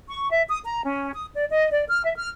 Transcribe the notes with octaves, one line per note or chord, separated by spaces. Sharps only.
C#6
E5
D#6
A#5
C#4
D#6
D5
D#5
D5
F6
E5
F6